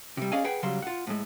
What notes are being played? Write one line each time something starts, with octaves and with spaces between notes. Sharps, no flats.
C3 G3
C#4 G#4 D5 D#5 F5 G#5
G#4 B4 F#5 G5
C#3 F#3 G3 C6
F4 F#5
A2 G#3